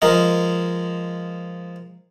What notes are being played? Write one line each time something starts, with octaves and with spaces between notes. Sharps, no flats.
F3 G#3 A#4 D#5